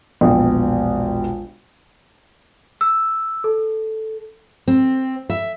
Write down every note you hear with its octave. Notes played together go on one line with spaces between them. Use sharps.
E1 A#1 B3 G5
E6
A4
C4
E5